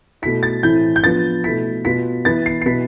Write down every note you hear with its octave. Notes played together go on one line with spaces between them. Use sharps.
B2 A3 E4 B6
A6
A2 E3 A3 C4 E4 G6
G6
F3 B3 D4 F4 A6
B2 A3 E4 B6
B2 B3 F4 B6
E3 B3 E4 A6
C7
C7
B2 B3 E4 B6